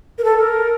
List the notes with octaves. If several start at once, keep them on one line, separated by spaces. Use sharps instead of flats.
A#4
A4
A#4